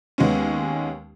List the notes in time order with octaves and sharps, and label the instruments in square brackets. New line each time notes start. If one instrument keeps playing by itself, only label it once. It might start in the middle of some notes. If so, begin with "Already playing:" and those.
[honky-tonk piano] D#2 G#3 B3 C#4